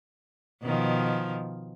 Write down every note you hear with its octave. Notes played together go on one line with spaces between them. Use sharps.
B2 D#3 F3